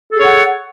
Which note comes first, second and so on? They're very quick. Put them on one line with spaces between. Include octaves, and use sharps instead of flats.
A4 G#4 C#5 F#5